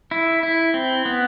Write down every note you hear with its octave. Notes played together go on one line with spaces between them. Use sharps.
E4
E4
C4
B3